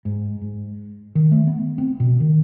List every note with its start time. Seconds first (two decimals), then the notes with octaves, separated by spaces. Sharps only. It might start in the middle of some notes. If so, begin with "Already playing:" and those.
0.05 G#2
0.41 G#2
1.15 D#3
1.31 A3
1.47 B3
1.78 C4
2.00 B2
2.20 D#3